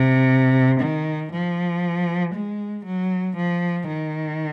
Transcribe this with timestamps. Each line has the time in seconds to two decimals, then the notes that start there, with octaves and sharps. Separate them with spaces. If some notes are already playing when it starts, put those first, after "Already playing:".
Already playing: C3
0.80 D#3
1.31 F3
2.34 G#3
2.85 F#3
3.36 F3
3.87 D#3